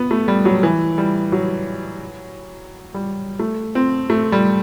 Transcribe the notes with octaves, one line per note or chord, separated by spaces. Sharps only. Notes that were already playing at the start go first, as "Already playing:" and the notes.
Already playing: B3
A3
G3
F#3
E3
G3
F#3
G3
A3
C4
A3
G3